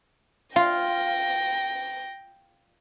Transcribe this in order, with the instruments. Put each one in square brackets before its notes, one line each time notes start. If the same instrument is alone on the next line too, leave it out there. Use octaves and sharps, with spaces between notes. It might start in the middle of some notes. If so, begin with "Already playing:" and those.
[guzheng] F4 [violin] G5 A#6